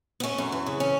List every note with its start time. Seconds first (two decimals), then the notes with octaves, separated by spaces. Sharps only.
0.20 B3
0.24 A3 C#4
0.38 F#2
0.52 E3
0.66 C#3
0.80 C#4